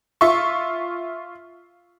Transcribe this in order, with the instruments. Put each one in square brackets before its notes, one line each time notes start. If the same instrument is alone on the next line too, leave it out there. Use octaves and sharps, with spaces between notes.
[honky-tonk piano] F4 E5 C#6